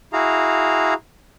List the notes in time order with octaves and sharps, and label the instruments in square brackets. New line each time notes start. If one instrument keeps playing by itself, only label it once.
[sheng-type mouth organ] E4 F#4 G#4 F5 A#5